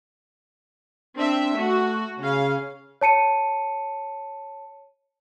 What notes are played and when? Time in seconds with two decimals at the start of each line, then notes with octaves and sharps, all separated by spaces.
1.17 C4 D4 E5
1.56 A3 F#4
2.19 C#3 C#4 F5
3.01 C#5 A5 C#7 D#7